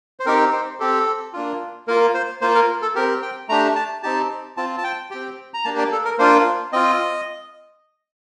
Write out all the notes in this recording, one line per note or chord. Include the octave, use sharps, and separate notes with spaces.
C5
C4 D#4 G4 A#4
C5
C4 G4 A4
A#3 D4 F4
A#3 F4 A#4
C5
A#3 F4 C5
A#4
A4
C4 G4 A#4
G5
A3 D4 G4 A#5
A5
C4 D#4 G4 A5
C4 F4 A5
A5
G5
C4 G4 G5
A#5
A#3 D4 G4 A5
D5
A4
A#4
A#3 D4 F4 C5
C4 F4 D#5